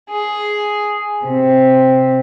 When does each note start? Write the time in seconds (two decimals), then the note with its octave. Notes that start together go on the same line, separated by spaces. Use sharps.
0.11 G#4
1.25 C3